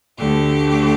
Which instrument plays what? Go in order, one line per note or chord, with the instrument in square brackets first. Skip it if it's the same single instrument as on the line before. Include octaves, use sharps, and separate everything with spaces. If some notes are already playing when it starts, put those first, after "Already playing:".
[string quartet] D2 D3 A3 G4